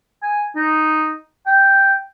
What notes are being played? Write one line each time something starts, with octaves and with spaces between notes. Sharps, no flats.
G#5
D#4
G5